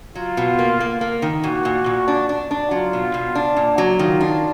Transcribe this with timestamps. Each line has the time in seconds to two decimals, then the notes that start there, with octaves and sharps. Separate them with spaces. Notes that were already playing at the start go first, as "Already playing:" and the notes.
0.15 F#3 F4
0.37 B2
0.59 A#3
0.80 A#3
1.01 A#3
1.22 D#3
1.44 A#2 F#4
1.65 A#2
1.86 A#2
2.08 D4
2.29 D4
2.51 D4
2.71 F#3 F4
2.93 B2
3.14 B2
3.35 D4
3.57 A#2
3.78 F#3
3.99 D#3 F4
4.21 D4